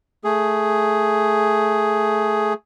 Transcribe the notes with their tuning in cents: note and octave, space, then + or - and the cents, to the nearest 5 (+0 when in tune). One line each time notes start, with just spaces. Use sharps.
A3 +0 G#4 +5